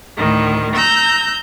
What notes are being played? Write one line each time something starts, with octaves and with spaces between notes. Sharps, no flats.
D2 A2 D#3
A#5 E6 G6